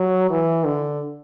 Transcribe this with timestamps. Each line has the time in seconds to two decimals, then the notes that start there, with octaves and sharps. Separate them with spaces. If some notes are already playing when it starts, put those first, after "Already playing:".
Already playing: F#3
0.30 E3
0.65 D3